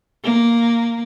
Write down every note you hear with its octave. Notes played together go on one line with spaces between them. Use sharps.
A#3